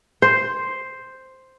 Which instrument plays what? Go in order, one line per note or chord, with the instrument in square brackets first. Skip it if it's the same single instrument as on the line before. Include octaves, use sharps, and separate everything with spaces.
[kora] C5